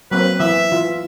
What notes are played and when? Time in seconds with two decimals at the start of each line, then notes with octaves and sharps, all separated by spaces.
0.11 F#3 A#3 C4 B4
0.40 E3 E5
0.72 E3 F4